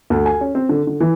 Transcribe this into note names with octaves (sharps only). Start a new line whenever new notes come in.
D2
G#5
C#4
C4
D3
D3
E3